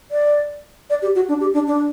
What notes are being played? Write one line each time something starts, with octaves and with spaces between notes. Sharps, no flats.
D5
D5
G4
F#4
D4
G4
D4
D4